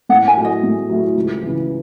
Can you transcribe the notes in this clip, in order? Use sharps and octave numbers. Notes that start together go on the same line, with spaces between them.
A2 F#5
G#5
F#3 A3 E4 G#4
D#5
A2
F#3 A3 E4 G#4
C#2
C#3 E3